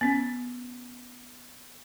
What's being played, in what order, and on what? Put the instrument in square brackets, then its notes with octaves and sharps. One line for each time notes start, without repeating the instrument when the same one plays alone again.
[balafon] B3 C#4